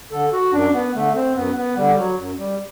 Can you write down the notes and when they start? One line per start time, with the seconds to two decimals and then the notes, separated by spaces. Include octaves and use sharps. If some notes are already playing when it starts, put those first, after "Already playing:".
0.11 D3 A4
0.33 F#4
0.53 F#2 D4
0.73 B3
0.95 D3 A3
1.15 C4
1.35 F#2 B3
1.56 B3
1.77 D3 G3
1.97 F#3
2.18 F#2
2.38 G3